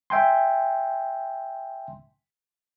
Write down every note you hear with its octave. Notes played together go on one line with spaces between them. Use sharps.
E5 G5 G#5 C6